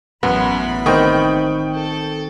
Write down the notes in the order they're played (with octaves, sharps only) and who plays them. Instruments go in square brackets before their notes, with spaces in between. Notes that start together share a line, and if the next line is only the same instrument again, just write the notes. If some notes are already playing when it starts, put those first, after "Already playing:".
[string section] A1 E3 B5 [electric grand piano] F#2 [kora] B3
[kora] D#3 C4 [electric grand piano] G5 C#6 D#6
[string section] A4